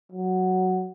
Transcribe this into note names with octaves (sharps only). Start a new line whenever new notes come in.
F#3